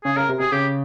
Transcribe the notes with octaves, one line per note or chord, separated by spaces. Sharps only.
C#3 G#4
C#3 A#4
C3
C3 G#4
C#3 G4